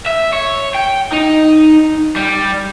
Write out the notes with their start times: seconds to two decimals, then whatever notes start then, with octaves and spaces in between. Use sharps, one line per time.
0.06 E5
0.33 C#5
0.75 G5
1.13 D#4
2.16 G3